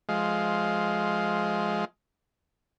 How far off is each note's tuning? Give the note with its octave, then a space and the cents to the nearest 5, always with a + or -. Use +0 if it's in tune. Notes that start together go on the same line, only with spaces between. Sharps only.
F3 +0 G#3 +10 F5 +0